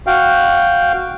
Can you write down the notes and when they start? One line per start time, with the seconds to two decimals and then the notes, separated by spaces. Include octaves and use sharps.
0.07 F#4 F5 G5